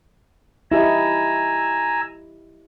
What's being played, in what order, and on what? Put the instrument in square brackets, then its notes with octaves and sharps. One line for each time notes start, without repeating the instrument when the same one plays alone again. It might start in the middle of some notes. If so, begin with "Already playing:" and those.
[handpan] E4 G4 D#5 [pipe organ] G#5 A#5 E6